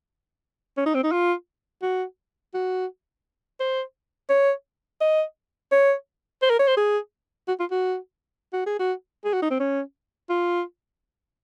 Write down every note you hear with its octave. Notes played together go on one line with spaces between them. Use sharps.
C#4
D#4
C4
D#4
F4
F#4
F#4
C5
C#5
D#5
C#5
C5
A#4
C#5
C5
G#4
F#4
F4
F#4
F#4
G#4
F#4
G#4
F#4
D#4
C4
C#4
F4